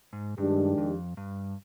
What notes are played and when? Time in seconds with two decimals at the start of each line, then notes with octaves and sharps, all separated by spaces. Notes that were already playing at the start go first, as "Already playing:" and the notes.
0.13 G#2
0.38 G2 D#3 G#3 D4 G4
0.78 F2
1.17 G2